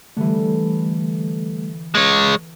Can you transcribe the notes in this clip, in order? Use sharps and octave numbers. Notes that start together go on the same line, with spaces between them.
D3 E3 G3 A3
G#3 C#5